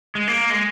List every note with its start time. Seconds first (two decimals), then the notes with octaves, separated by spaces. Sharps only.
0.15 G#3
0.28 A#3
0.50 G#3